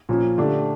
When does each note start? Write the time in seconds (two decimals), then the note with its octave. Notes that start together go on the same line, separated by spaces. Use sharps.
0.09 A#2 F3 C#4
0.38 D3 A3 D4 G4